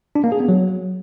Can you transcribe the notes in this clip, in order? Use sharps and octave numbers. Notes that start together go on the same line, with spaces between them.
D4
A#3
G#4
B3
F#3